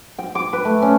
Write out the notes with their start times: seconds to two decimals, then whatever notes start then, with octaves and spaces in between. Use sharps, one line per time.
0.19 G5
0.35 D6
0.53 B4
0.65 A3
0.82 C#4